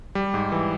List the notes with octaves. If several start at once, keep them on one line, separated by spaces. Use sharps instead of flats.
G3
G#2
E3